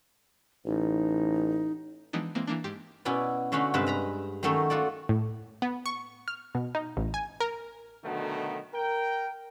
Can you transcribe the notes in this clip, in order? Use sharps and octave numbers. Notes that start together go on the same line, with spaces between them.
A1 D#4
E3 F3 G#3 B3 D4 D#4
E3 G#3 A#3 C4
E3 A#3 D4
G#2 G4 C6
B2 C#4 E4 D5 G#5
D3 A3 C#4 F#4 F5 B5
G2 C3 G#3 B4 E5 A5
B4 A#5 B5
D#3 F#3 A3 C#4 A4 A#4
F4 F#4 A4 D5
A2
B3
C#6
F6
B2
D#4
A1
G#5
A#4
B2 D3 D#3 F#3 A3
A#4 G5